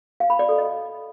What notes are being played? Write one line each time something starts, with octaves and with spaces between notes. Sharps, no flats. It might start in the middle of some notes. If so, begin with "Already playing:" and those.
F5
B5
D5
A4
D#5